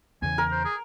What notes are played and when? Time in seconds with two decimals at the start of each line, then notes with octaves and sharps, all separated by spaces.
0.22 E2 C#3 E3 G#5
0.38 A#4
0.52 C5
0.65 G#4